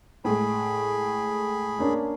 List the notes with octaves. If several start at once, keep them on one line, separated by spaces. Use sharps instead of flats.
A2 G#3 G#4 B5
A#3 C#4 D4